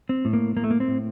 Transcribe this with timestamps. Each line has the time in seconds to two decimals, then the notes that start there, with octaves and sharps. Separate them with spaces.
0.09 C4
0.25 A2
0.33 A#3
0.57 A2 A#3
0.64 A3
0.71 A#3
0.80 C4
0.88 A2